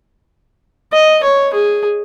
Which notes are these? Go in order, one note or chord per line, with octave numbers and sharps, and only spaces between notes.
D#5
C#5
G#4